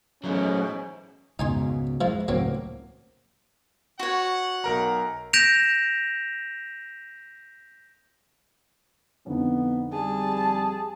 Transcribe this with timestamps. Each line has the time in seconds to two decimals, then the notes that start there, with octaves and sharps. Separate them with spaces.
0.24 E2 G#2 B2 F#3 A3 C#4
1.39 C#2 G#2 B2 D#4 G#5 C6
2.01 F3 G#3 E4
2.28 C#2 A2 F#3 A#3 C4
3.99 F#4 C#5 F#5
4.64 B1 A#4 A#5
5.33 G6 A#6 B6 D7 E7 F7
9.26 F2 D3 B3 D#4
9.93 G3 G#4 A5